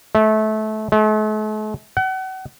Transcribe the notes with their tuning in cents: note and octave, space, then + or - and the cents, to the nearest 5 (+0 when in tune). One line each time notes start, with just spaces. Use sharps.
A3 -25
A3 -45
F#5 +35